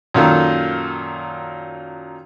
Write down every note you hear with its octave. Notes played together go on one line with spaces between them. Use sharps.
F#2 A#2 D#3 A4